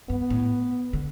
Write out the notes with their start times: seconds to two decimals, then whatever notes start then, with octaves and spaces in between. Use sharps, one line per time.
0.10 G2 B3
0.30 A2
0.93 D3